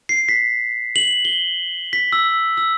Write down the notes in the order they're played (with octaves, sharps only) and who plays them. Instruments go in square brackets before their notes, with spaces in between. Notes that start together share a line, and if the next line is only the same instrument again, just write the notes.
[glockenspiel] C7
B6
F#7
G7
B6
E6
E6